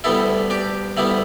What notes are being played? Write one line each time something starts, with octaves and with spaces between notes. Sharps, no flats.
D2 D3 G3 B3 E4 A4
D4 G4
D2 D3 G3 B3 E4